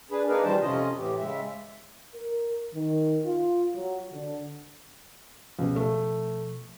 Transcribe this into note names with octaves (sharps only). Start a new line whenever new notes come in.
D4 G#4 B4
A#3 D4 D#4 G#4 A#4 B4
A#2 D#3 E3 G3 C5 A5
F2 C3 C#4 F4 D#5
A2 E3 G4
C#3 G#3 E5
A#4
D#3
F4
F#3
D3
C#2 B2 F3
A3